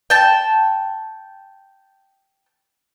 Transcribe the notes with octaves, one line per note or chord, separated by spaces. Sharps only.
G5 A5